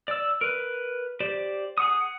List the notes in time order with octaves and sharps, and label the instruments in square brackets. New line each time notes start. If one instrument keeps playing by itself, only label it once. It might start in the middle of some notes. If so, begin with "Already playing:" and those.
[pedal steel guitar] D5 E6
A#4 B4
G4 C5 D5
G#4 F#5 D#6
F#5